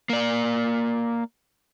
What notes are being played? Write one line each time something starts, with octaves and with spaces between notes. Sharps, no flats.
A#3 D5